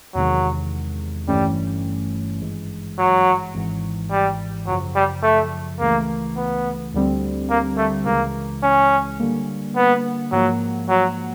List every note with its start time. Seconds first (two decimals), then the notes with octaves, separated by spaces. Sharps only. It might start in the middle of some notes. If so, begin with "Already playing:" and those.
0.15 E2 C3 D#3 F#3 G#3
1.28 G1 G2 E3 G3 A3 C#4
2.41 G#1 G2 E3 G#3
2.98 F#3
3.54 G#1 G#2 E3
4.11 G3
4.67 F#2 C#3 F3 F#3
4.96 G3
5.23 A3
5.80 C#2 C#3 E3 A3 A#3
6.36 B3
6.94 D2 D3 G3 C4
7.50 A#3
7.77 A3
8.06 C#2 C#3 E3 G#3 A#3
8.63 C#4
9.20 D3 G3 A#3
9.76 B3
10.32 G#2 F3 F#3 A#3
10.89 F#3